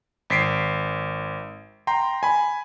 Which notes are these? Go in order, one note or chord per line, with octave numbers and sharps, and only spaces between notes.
G#1 B6 C7 D7
G5 A#5 C6
G#5 B5